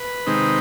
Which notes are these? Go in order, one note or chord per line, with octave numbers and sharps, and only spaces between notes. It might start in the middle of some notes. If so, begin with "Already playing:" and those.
Already playing: B4
C3 D#3 G#3 C4 D#4